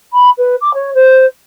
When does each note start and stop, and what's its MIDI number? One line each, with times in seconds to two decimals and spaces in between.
0.13 0.30 83
0.38 0.55 71
0.61 0.74 86
0.74 0.94 73
0.94 1.25 72